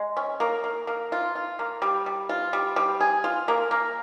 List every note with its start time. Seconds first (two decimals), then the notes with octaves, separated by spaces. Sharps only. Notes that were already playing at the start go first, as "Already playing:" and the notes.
Already playing: G#3
0.17 C#4
0.40 A#3
0.64 A#3
0.87 A#3
1.12 F4
1.35 F4
1.59 A#3
1.82 G3
2.06 G3
2.29 F4
2.53 G3
2.76 G3
3.00 G#4
3.24 F4
3.48 A#3
3.71 A#3